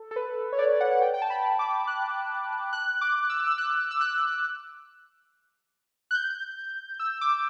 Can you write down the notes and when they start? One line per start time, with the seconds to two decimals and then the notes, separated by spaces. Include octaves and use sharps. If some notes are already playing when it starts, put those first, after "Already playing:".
Already playing: A4
0.11 A4
0.16 B4
0.52 C#5
0.58 D5
0.81 F#5
0.91 F#5
1.01 G5
1.14 G5
1.22 A5
1.30 B5
1.59 D6
1.87 F#6
2.73 F#6
3.01 D6
3.30 E6
3.46 E6
3.58 F#6
3.91 E6
4.01 F#6
6.11 F#6
6.14 G6
6.99 E6
7.21 D6